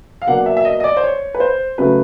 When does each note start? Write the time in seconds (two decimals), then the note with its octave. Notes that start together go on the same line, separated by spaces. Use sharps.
0.22 F5
0.27 B2 F#3 A#3 D4 F#5
0.46 E5
0.57 E5
0.65 D#5
0.80 D#5
0.84 D5
0.97 C5
1.04 C#5
1.35 B4
1.40 C5
1.78 C#3 F#3 A3 B4